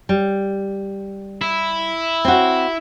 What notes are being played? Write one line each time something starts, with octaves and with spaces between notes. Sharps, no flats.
G3
E4
C4 F#4